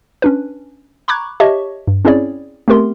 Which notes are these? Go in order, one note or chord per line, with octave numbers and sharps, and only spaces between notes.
C#4 D4 B4
A#5 B5 C#6 D6 F#6 G#6
G4 C#5 D#5 E5 A5 C#6
G2
C4 C#4 E4 G#4 C#5 D5
A3 B3 C4 G4 A#4 C6